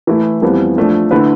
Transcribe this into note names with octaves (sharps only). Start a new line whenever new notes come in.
E3 A3 E4
F2 E3 G3 B3
F3 A3 D4
D3 A3 E4 B4